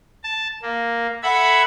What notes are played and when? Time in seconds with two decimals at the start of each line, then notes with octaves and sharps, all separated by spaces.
0.23 A5
0.62 A#3
1.23 A4 E5 F#5 B5 G#6